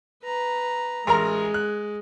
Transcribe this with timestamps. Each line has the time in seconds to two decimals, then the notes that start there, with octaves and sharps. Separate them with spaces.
0.24 B4 A#5
1.07 A1 G#3 A#4 A#5
1.54 F#6